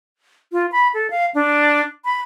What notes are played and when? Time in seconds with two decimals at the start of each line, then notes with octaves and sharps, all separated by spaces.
0.52 F4
0.72 B5
0.94 A4
1.10 F5
1.34 D4
2.05 B5